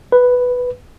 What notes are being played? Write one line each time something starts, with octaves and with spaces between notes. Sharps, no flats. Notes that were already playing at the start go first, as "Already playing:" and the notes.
B4